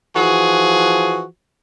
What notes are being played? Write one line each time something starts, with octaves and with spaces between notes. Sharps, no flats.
E3 F3 F#4 G#4